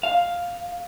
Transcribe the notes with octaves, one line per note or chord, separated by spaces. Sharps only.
F5